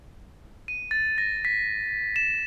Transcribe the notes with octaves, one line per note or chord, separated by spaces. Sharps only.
D#7
A6
A#6
B6
E7